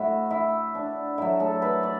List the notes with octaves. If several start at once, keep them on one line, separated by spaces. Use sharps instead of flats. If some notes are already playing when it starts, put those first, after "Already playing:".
Already playing: A2 E4 F#4
E4
D4
A2 F#3 E4
A4
B4
D5